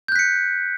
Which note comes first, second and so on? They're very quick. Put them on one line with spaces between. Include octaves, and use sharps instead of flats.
G6 F#6 B6 C#7